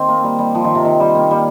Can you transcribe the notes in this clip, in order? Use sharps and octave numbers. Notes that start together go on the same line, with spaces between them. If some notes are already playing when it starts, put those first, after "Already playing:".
Already playing: D#3 C4
A#3
G3
G3
F3
D#3
C3
D#3
G3
A#3
G3